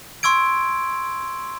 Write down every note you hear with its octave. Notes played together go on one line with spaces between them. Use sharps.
C6 C#6 E6 G#6 D7